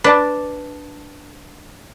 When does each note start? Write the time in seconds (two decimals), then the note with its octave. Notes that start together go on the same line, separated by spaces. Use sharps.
0.04 D4 B4 D5 A5